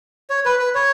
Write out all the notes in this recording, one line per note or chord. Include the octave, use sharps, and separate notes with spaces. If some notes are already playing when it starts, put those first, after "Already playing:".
C#5
B4
B4
C#5